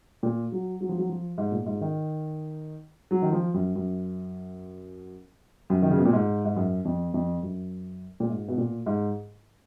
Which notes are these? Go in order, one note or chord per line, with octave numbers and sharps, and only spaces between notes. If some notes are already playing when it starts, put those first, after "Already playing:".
A#2
F#3
F#3
F3
F#3
F3
G#2
A#2
G#2
D#3
F#3
D#3
F3
F#2
F#2
F#2
D#3
C#3
B2
A#2
G#2
G#2
F#2
F2
F2
F#2
A#2
G#2
B2
A#2
G#2